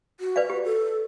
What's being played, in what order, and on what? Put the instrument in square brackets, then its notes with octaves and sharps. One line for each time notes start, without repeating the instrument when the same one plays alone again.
[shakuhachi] F#4
[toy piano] B4 D5 F5
G4
[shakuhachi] A4